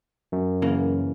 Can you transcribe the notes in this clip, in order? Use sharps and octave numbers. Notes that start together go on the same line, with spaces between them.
F#2
C#3 E3 A#3